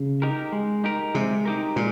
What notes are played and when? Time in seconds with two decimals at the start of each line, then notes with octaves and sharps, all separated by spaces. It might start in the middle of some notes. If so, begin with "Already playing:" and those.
Already playing: C#3
0.22 D#4 G4 A#4
0.52 G#3
0.84 D#4 G4 A#4
1.14 C3 G#3
1.45 D#4 G4 A#4
1.76 A#2 G#3